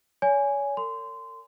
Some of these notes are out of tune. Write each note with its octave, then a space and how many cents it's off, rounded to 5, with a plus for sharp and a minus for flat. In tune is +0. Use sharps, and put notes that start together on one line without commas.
C#5 +35 G#5 +0
A#4 -45 C6 -20